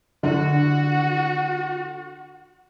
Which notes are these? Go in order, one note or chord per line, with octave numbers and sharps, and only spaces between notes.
D3 F#4